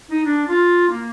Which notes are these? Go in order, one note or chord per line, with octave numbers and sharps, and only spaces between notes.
D#4
D4
F4
A#3